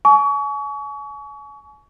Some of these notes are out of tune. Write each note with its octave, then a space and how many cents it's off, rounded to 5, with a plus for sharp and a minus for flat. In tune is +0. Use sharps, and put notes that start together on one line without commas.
G#5 +35 C#6 +35